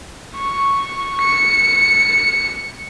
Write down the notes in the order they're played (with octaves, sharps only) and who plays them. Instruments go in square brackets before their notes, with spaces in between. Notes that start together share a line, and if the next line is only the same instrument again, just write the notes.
[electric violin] C#6
C#7